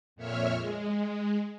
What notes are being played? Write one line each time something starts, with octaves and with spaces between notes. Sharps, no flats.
F2 A#2 C#5 E5 F6
G#3